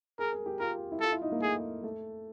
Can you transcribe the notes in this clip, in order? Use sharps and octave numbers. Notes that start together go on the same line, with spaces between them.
G#4 A#4
A#4
G4
F4 A#4
E4
F4 A4
E4
D#4
A#3
A3 G#4
A3